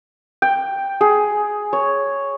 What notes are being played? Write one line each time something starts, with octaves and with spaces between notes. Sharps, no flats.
G5
G#4
C#5